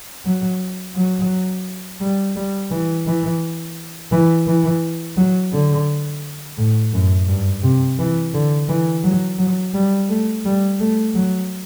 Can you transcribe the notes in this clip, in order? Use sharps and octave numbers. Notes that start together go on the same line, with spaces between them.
F#3
F#3
G3
G3
E3
E3
E3
E3
F#3
D3
A2
F#2
G2
C3
E3
D3
E3
F#3
F#3
G3
A3
G3
A3
F#3